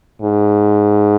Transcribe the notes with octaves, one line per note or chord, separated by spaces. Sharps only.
G#2